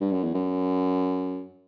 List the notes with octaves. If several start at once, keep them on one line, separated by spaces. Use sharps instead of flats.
G2
F#2
E2
F#2